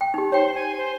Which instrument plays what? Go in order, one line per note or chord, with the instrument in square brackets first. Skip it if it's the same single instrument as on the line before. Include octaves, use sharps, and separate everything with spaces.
[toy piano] G5
D#4 G4
[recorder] C5 [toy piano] C#5 G5
[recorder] G#5
C5